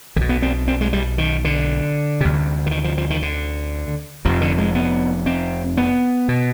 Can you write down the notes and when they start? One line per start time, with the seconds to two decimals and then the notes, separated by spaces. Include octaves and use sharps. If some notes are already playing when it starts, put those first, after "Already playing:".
0.16 B1 D3
0.21 B2
0.29 B3
0.42 C4
0.68 C4
0.81 G#3
0.93 G3
1.18 D#3
1.45 D3
2.21 D2 C3
2.66 D3
2.71 D#3
2.84 F3
2.98 F3
3.10 D#3
3.22 D3
4.25 F1 F2 C3 F3
4.41 D3
4.58 G#3
4.75 B3
5.26 C4
5.77 B3
6.28 B2